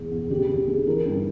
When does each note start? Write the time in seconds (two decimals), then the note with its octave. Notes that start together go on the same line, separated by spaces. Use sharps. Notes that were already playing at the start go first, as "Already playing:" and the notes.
Already playing: E2 B2 G#4
0.11 E2
0.24 G#4
0.30 D3 G4
0.48 D3 G4
0.67 D3 G#4
0.86 E3 A#4
1.05 G2